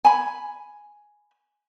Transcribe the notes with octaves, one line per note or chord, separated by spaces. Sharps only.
G#5 B5